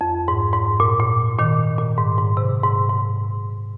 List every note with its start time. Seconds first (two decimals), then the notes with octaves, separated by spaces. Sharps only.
0.01 F2
0.28 G#2
0.54 G#2
0.80 A#2
1.00 A#2
1.39 A#2 D#3
1.78 A#2
1.98 G#2
2.18 G#2
2.37 C3
2.63 G#2
2.90 G#2